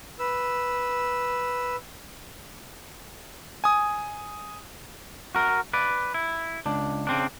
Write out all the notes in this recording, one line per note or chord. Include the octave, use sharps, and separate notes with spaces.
B4 E6
G#5 D#6
F#4 A#4
B4 D5
E4
C#2 D4
C#3 C4 D4